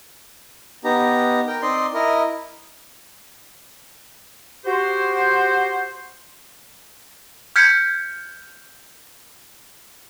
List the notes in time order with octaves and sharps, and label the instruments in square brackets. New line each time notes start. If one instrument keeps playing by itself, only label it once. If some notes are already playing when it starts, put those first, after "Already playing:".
[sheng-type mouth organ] B3 D#4 G4 A#5
A#4 G5
C4 D#4 D5 D#5 C6
E4 A#4 D#5
[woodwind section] F#4 G4 C5
[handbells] F6 G6 G#6 B6 C#7